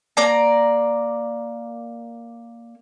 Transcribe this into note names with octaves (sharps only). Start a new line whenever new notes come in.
A#3 D5 A#5